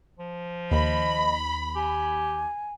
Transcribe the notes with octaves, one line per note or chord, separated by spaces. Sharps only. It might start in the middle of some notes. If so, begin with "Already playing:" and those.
F3
D#2 D#5 B5
G4 G#5